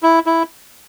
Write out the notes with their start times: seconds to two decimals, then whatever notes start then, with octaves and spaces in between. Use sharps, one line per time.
0.03 E4
0.26 E4